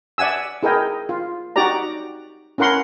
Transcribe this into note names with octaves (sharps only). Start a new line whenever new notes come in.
D5 E5 F#5 G#5 E6
E4 G#4 A#4 D#5 G5
F4
D#4 F#4 G4 D5 A#5
C#4 E4 A#4 F#5 C6